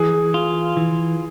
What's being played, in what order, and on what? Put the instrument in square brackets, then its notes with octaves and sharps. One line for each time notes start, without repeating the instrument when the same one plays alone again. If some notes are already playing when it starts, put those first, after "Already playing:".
Already playing: [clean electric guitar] E3 [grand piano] G#4
[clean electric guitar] F4
E3